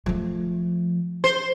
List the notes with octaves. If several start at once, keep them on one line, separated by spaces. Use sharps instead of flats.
F3 A3
C5